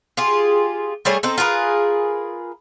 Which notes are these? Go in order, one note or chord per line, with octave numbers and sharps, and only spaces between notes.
F4 G4 G#4
G3 A3 G#4 C#5
C4 D#4 A4
F4 G#4 A#4 B4